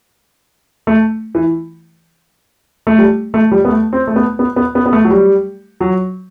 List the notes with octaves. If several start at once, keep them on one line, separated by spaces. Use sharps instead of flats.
A3
E3
A3
G3
A3
G3
B3
A3
C4
A3
B3
B3
B3
B3
B3
A3
F#3
G3
F#3